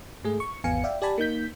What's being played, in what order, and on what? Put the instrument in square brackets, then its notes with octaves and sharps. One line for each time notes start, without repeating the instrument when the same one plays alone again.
[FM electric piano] G#2 A3 G#4
C#6
G#1 E2 B3 F5 G#5 C#7
D5 E5 F5 G5
G4 D5 G#5 A5 B5
A#3 D#4 G6 B6